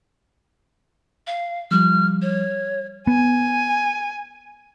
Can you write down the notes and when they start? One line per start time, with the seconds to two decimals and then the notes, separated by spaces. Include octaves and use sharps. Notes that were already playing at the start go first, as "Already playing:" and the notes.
1.27 F5
1.71 F3 G3 F6
2.22 C#5
3.07 B3 G#5